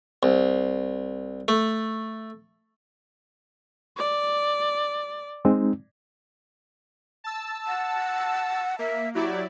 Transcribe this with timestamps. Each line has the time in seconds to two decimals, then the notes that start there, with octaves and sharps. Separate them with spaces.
0.23 C2
1.48 A3
3.97 D5
5.45 G#3 C4 D#4
7.24 A5 E6
7.67 F#5
8.79 A#3 E5
9.15 F#3 E4 G4 D5